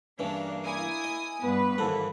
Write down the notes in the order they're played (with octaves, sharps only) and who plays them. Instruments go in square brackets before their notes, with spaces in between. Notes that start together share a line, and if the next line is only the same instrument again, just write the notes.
[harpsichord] G2 C#3 E3 [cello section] A#3 [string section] D4
[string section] E4 G#5 D#6
[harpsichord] D#5
[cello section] G2 B4 [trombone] B3
[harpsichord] D#2 G#2 F#5 [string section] E3 [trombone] A4